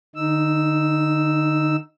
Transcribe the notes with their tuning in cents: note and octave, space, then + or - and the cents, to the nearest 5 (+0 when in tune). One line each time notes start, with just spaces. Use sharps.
D3 +35 D#4 +0 E6 +0